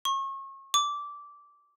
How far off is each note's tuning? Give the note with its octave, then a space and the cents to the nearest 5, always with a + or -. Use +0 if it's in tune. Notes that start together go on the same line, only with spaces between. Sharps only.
C#6 -35
D6 -15